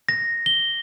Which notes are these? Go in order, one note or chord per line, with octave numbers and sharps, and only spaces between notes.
A#6
G7